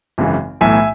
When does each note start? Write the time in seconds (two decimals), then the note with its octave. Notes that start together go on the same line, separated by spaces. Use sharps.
0.18 G#1 F#2 C#3 E3
0.61 B1 A2 E3 E5 G#5